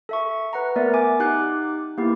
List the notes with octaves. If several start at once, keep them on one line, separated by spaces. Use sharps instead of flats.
A4 E5 C#6
B4 F#5 A#5
A3 B3 A#4 D5 E5
G#5 D6
D#4 G4 F#5 D6 F#6 G6
A#3 B3 E4 G4